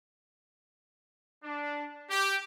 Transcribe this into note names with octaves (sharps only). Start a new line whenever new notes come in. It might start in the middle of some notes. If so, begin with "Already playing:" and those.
D4
G4